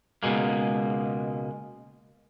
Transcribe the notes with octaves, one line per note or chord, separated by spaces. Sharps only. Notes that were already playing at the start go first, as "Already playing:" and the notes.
C#2 B2 G#3 A#3